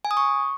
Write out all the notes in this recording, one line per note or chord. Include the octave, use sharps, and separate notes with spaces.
G#5
D#6
C#6